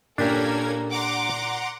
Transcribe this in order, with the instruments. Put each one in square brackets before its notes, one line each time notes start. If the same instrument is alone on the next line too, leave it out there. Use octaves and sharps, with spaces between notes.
[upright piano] A#2 [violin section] A#3 A4 [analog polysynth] C#4 A#4 G#6 [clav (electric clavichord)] D4 G4
[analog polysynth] F#5 A#5 C6 [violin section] D6